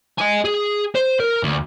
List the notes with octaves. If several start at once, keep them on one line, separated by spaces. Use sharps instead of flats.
D#5 G#5
G#4
C5
A#4
D2